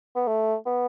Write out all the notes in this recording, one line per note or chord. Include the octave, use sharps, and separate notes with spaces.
B3
A3
B3